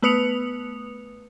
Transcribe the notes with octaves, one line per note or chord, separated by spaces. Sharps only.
A3 B3 B4 D#6 C#7 F7